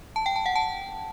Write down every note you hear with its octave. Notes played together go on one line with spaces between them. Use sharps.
A5
G5
A5
F#5
A5